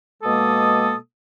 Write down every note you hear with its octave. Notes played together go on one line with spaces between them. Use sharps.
B2 G#3 A#3 A4 D#6